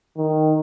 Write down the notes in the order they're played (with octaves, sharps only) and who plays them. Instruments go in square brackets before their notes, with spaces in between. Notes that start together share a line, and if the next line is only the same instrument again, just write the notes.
[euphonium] D#3